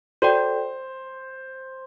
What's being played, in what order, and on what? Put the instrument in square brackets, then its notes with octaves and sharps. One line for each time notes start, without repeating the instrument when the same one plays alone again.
[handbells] F#4 A4 D5 G5 [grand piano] C5